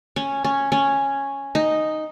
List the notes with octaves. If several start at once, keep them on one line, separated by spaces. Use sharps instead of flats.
C#4
C#4
C#4
D#4